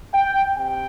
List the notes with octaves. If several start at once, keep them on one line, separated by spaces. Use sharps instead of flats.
G5
C3 G5